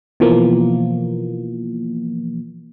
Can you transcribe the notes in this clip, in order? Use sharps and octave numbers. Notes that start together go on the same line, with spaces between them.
B2 E3 F3 A#3